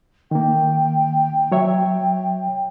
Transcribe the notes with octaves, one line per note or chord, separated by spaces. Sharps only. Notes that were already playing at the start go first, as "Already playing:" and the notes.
D#3 A#3 G5
F#3 C#5 E5